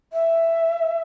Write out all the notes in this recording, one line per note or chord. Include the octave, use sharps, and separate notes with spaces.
E5